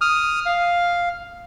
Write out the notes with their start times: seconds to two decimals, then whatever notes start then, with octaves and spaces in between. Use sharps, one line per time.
0.01 D#6 F6
0.46 F5